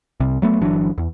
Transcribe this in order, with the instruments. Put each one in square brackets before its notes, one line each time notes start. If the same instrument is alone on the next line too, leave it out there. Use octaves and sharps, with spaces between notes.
[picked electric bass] C2 C3
F#3 A3 B3
G1 E3 F#3 D4
E2